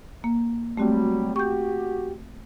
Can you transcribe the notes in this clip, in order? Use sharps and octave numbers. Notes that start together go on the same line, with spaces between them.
A#3
F#3 G3 A3 C4 F#4
F#4 G4 C#6 G6